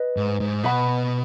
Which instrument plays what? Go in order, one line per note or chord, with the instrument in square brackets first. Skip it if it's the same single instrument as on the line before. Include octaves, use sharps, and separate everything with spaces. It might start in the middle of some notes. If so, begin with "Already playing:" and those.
Already playing: [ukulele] B4 D#5
[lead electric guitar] G#2
G#2
[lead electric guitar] B2 [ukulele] B4 F#5 B5